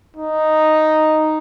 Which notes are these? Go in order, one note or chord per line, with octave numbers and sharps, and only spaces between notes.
D#4